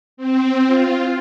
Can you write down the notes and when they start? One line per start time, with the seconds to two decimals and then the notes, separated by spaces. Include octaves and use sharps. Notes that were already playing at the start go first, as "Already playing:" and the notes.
0.17 C4
0.67 F4